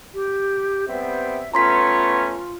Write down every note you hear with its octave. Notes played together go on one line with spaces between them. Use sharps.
G4
G3 B3 C4 E5
A3 B3 C#4 F4 A#5 C6 B6